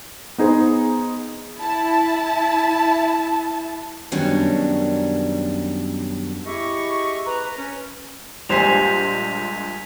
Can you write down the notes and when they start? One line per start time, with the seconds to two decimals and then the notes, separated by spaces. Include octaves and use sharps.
0.38 B3 D#4 G#4 C5
1.57 E4 A5
4.12 F#2 B2 D#3 G3 C#4 D4
6.46 E4 G4 G#4 D#5 E5 C#6
7.26 B4 A#5
7.57 C#4
8.49 A#1 G3 G#3 C5 G#5 B6 E7 F7